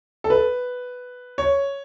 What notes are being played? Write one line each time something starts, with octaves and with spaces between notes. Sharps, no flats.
A4
B4
C#5